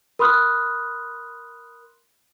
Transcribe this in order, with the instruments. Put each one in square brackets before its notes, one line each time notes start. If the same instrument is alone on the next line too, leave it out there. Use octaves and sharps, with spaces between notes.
[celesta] A#4 B5 C6 D#6 F6 F#6